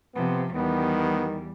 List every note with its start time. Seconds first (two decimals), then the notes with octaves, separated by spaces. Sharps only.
0.15 C3 F3 B3
0.56 E2 D#3 G3 B3